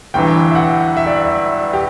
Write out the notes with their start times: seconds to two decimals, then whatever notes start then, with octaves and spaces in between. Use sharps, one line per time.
0.14 G1 G2 E3 G5
0.51 E5
0.55 F#5
0.97 E5
1.06 D5
1.16 E5
1.73 G4